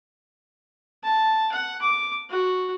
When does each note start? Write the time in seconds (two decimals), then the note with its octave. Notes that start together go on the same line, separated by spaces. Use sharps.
1.04 A5
1.51 F#5
1.81 D6
2.30 F#4